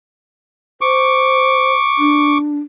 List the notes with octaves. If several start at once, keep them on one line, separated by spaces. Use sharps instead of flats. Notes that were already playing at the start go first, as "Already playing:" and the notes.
C5 C#6 D6
D4